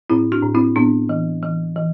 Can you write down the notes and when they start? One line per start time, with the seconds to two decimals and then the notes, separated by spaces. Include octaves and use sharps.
0.10 A2 C4 E4
0.32 D4 F#4
0.43 A2
0.55 C4 E4
0.76 A2 B3 D4
1.09 E3
1.43 E3
1.76 E3